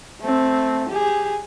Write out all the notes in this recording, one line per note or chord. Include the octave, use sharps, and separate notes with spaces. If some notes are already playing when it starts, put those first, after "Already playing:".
A3 C4
G4 G#4